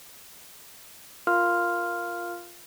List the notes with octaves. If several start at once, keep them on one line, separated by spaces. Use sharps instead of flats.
F4 A#4 F5 C6 F6